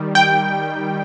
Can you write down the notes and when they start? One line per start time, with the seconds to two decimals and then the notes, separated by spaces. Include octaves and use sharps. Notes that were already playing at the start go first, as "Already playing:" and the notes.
Already playing: D#3 G3
0.15 G5